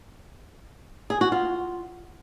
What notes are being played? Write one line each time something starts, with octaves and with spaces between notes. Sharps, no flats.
G#4
F#4
F4